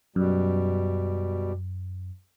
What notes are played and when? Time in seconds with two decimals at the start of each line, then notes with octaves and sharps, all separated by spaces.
0.16 F#2 B2 G3